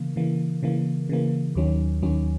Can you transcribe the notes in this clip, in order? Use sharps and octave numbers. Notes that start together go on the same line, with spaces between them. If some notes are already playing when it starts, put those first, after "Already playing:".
Already playing: C#3 E3 A#3
C#3 E3 A#3
C#3 E3 A#3
C#3 E3 A#3
D#2 D#3 F#3 C#4
D#2 D#3 F#3 C#4